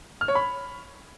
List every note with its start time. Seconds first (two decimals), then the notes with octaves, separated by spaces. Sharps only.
0.21 F6
0.28 C#5
0.35 B5